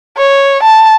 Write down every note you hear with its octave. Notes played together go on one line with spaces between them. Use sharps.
C#5
A5